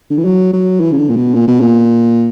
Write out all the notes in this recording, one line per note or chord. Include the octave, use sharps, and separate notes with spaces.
D3
E3
F#3
F#3
E3
C#3
D3
A#2
B2
A#2
B2
A#2